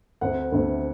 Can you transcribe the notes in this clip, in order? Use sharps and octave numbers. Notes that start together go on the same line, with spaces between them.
D2 D3 A3 C4 F#5
D2 D3 A3 C4